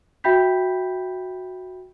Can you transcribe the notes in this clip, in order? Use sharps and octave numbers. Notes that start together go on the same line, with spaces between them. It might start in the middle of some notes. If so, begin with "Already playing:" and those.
F#4 E5 G5 B5 G6 B6